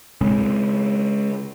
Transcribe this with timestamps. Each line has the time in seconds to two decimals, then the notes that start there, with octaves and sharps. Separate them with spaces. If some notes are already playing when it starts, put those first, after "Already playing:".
0.21 C#3 G#3 C4